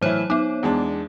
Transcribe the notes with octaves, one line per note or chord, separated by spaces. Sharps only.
A2 E3 F#3 E4 C5 C#5
B3 D#4 D6
E2 G#3 D4